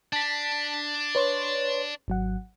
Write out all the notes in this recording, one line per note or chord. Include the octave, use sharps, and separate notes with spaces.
D4 A5 B6
B4 C#5 C6
G#1 F#3 F#5